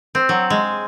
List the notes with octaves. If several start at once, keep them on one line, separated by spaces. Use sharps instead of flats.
C4
F#3
G#3